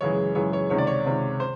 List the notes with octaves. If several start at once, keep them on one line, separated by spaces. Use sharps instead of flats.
F#2 C#3 E3 G#3 C#5
F#2 C#3 E3 G#3 C#5
C#5
C#2 C3 D#3 C#5
D5
C#5
C#2 C3 D#3
C5